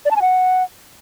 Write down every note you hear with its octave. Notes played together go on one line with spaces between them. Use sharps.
D5
A5
G#5
F#5